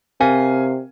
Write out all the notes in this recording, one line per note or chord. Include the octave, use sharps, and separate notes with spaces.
C3 C4 A#4 F5 G#5